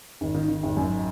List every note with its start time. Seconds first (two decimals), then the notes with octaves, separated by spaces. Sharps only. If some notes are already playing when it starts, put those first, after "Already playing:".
0.21 G#1
0.35 D#3
0.49 D#3
0.63 G#1
0.77 F#2